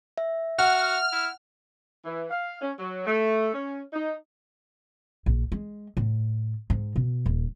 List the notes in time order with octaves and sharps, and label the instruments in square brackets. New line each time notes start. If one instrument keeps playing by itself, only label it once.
[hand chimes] E5
[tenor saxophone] F#4 [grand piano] F#5 [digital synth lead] F6
[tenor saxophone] E4
[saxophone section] E3
F5
C#4
F#3
A3
C#4
D#4
[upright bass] A#1
G#3
A2
G#2
B2
D#1